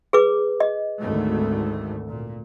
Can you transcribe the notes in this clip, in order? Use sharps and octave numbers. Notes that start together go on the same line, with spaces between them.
G#4 B4 D6
D#5
G#1 D2 A3
A#2